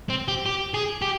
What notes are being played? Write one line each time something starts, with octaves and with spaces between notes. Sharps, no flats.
C4
G4
G4
G#4
G4